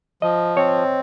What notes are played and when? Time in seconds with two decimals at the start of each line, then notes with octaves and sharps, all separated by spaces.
0.22 F3 D#5
0.56 C4 C#5